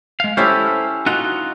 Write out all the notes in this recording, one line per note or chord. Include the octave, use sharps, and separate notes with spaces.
G#3 F5
C#4 E4 G4 A4 C5
D#4 F4 F#4 F#5